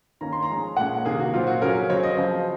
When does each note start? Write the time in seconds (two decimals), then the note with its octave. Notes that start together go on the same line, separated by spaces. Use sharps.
0.21 D#3 A#3 C#4 A#5
0.32 C6
0.43 A#5
0.49 F3 G#3 C#4
0.77 A#2 G#3 C#4 F#5
1.05 C3 D#3 A#3 G#4
1.20 F#4
1.33 A#2 F#3 C4 F4
1.47 F#4
1.61 C#3 F#3 C#4 A#4
1.90 C#3 F#3 C4 C#5
2.03 D#5
2.17 C#3 F3 C4